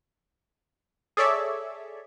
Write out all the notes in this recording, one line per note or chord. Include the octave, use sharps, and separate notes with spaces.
G#4 A4 C#5 D5 E5